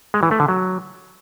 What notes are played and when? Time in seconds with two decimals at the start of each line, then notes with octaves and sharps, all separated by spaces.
0.14 G#3
0.23 E3
0.31 A3
0.40 D3
0.48 F#3